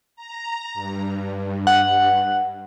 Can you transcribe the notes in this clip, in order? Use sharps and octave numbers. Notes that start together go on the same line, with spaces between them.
A#5
G2
F#5